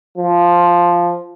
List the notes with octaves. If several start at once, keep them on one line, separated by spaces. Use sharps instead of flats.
F3